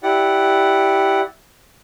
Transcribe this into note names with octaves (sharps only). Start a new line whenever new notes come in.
E4 G4 D5 F#5